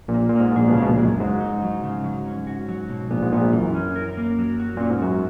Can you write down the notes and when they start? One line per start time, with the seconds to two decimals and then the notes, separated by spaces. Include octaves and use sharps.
0.08 A#1 A#2
0.14 A#3
0.29 A#2
0.35 G#2 A#3
0.56 A#1 A#2 G#4
0.67 B2
0.72 C#2 C#3 G#3
0.82 B2
0.88 A#1 A#2
0.99 G#3
1.04 F#2
1.20 G#2 F#3
1.41 D#4
1.62 F#3
1.83 C#3
2.04 F#3
2.26 C#4
2.47 F#4
2.68 F#3
2.89 B2
3.10 A#1 A#2 B3
3.23 G#2
3.32 A#1 A#2 B3
3.53 F#2 E3
3.75 C#4
3.96 A#4
4.17 A#3
4.39 F#3
4.60 F#4
4.76 A#2 C#4
4.89 G#2
5.02 F#2 F#4